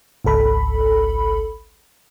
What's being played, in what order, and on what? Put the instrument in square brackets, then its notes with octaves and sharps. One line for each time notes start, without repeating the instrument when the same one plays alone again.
[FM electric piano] G#1 C#2 A4 B5